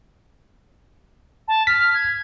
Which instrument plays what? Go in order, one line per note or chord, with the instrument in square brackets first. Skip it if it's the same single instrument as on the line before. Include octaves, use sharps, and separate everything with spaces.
[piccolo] A5
[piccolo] F6 [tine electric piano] B6
[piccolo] G#6